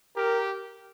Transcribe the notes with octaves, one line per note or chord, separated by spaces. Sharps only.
G4 A#4